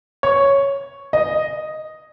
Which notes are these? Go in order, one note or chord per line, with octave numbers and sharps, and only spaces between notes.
C#5
D#5